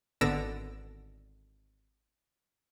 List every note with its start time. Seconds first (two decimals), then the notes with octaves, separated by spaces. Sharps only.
0.21 G#1 D3 B3 E6 A#6 D7